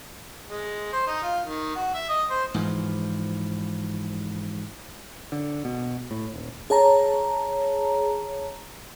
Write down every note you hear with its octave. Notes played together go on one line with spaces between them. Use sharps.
G#3
C5
D#4
F4
D#3
F#4
E5
D#5
C5
G#2 E3 F3
D3
B2
A2
D#1
G#4 C#5 A5 A#5